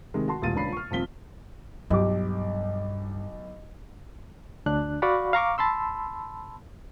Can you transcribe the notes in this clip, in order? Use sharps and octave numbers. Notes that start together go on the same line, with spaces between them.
C3 D#3 G#3
F#4 A5 C6
E1 A#2 G3 F4 A6 D#7
D#1 C#2 C#4 D4 B5 C7
C#6 F6
D#1 F3 C4 B6 G7
B1 G2 G4 D6
D2 D4 F#6
F#4 D5 F5 F#5 B5 C#6
F5 A#5 C#6 D6
A5 B5 C6 E6